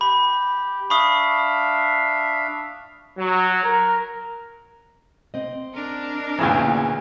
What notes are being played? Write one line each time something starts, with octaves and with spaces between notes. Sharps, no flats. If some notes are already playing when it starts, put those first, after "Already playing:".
G4 B5
D4 E5 F5 B5 C#6 D#6
F#3
A#4
C4 D#5
D4 A#4
D2 A#2 C#3 E3 A#3 B3